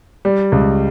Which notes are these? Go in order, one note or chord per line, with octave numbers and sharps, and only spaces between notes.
G3
C#2